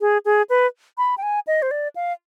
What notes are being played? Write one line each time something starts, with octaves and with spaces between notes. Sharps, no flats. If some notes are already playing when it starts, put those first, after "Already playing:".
G#4
G#4
B4
B5
G5
G#5
D#5
C5
D5
F5